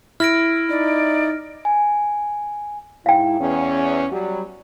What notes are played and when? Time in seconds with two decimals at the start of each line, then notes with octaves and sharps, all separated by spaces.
0.20 E4 F6 A#6 D7
0.70 D#4 D5
1.65 G#5
3.06 G#2 E4 F5 G5
3.40 E2 C#4
4.12 F#3 G3